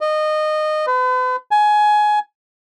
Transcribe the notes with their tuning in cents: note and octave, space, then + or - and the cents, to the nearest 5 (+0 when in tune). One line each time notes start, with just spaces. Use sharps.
D#5 -20
B4 +40
G#5 +20